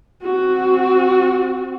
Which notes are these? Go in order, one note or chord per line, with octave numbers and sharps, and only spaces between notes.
C4 F#4